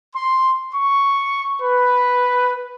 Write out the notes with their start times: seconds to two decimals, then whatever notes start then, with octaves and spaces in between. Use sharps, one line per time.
0.15 C6
0.73 C#6
1.62 B4